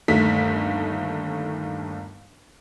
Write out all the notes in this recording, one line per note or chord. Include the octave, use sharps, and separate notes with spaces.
G1 D#2 A3 B6